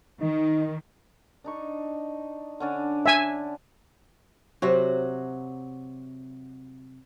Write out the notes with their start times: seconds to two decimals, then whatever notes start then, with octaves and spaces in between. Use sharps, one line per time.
0.20 D#3 D#4
1.44 D4 D#4 C#6
2.60 D3 C#4 D4
3.06 E5 G#5
4.62 C3 F#3 F#4